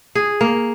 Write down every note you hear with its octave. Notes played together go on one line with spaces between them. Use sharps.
G#4
A#3